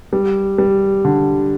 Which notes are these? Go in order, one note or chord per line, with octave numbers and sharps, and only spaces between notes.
G3
G3
D3